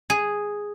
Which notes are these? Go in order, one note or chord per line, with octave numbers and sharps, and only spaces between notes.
G#4